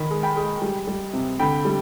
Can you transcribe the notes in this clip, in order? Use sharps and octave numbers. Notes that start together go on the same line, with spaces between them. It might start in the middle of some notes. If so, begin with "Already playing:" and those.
Already playing: D#3 B5
G#3
G5 B5
G#3
G3
G3
C3
D3 G5 B5
G3